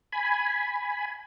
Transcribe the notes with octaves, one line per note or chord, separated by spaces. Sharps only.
G#5 B5